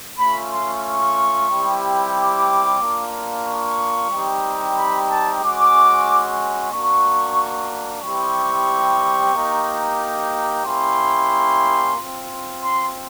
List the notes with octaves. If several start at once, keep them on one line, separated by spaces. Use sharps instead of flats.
A3 C#4 F4 B5
C6
C#6
G3 C4 E4 G4
D6
A#3 D4 F4
C#6
G3 C4 D#4 G4
B5
A5
G#3 C#4 F#4 D6
A#3 D4 F#4 C#6
G3 C4 E4 G4 C#6
A#3 D#4 G4
A#3 C#4 E4 G4 C6
C4 F4
C6